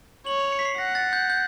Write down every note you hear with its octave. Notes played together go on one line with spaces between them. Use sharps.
C#5 F#7
F7
C#7
B6
C7
F#5 A#6
A6
G6
G6